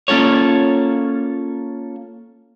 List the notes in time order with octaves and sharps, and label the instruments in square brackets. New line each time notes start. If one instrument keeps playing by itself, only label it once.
[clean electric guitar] A#3 C#4 F4 A4 C#5